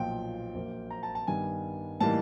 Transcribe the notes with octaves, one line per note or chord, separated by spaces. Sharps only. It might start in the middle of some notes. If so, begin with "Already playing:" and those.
Already playing: B1 A#2 F3 G5
A#1 A#2 F#3 A#3
A#5
A5
A5
G2 D#3 G3 B3 G#5
A2 E3 G3 A#3 D#4 A5